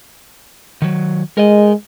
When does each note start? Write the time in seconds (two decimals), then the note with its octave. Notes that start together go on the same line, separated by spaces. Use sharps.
0.82 D#3 F#3
1.37 G#3 A#4 D#5